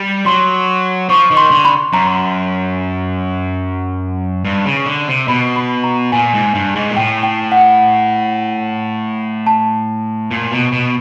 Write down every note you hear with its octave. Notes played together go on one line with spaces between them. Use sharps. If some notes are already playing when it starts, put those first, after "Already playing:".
Already playing: G3
F#3 C6
F3 C#6
D#3
C6
D3
B5
F#2 A#5
G2
C#3
D3
C3
B2 B5
B5
A#5
A#2 G#5
G#2
G2
G#2
A#2
A2 G5
G5
F#5
A5
A#2
B2
B2